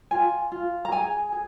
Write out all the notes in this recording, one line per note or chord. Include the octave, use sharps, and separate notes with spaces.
F4 G#5
F4
A#5
G#4 G#5
G#4